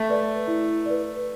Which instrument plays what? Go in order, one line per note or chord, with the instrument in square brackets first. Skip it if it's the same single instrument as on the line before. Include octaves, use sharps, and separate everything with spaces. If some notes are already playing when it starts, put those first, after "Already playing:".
Already playing: [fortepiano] A3
[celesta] B4 D5
E4
B4 D5